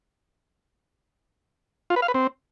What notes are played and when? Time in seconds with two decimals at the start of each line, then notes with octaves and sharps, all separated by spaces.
1.90 F4
1.96 B4
2.02 F5
2.08 B4
2.14 C4